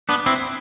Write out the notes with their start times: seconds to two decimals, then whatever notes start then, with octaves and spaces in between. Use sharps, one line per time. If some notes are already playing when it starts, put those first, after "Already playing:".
0.09 B3 D4
0.26 C4 E4